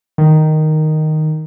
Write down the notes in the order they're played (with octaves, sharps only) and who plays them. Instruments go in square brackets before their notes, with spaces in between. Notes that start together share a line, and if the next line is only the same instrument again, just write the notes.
[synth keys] D#3